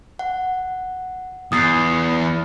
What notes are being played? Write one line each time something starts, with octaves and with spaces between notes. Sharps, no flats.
F#5
E2 D#6 A6 C7